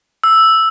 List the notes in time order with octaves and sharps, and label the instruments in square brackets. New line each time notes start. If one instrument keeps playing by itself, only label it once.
[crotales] E6